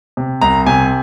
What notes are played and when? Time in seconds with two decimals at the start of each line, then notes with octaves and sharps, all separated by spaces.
0.17 C3
0.41 C2 A#5
0.66 C3 G#5